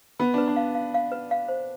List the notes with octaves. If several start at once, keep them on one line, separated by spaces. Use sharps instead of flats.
B3 B5
D4 B4
D4
F5
F5
F5
B4
F5
C5